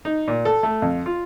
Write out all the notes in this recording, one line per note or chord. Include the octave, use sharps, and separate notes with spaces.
D#4
A#2
A4
A3
F2
F4